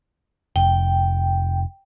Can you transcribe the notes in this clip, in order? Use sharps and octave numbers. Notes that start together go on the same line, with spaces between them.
F1 G5